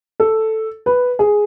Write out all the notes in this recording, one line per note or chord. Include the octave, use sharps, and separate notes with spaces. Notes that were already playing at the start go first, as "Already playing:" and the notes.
A4
B4
G#4